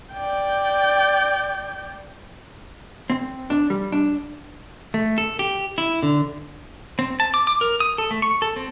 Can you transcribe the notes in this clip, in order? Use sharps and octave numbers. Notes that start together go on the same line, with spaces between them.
D5 G5
C4
D4
G3
D4
A3
A4
G4
E4
D3
C4
A5
D6
D6
A#4
D#6
A4
A3
C#6
A4
C4